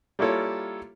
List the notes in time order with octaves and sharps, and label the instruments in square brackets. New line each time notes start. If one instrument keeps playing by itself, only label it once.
[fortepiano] G3 A#3 E4 F4 A4 C#5